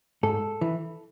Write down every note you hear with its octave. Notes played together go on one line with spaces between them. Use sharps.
G#2 A4
E3